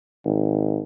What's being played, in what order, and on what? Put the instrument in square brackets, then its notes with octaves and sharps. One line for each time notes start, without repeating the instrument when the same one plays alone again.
[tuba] G#1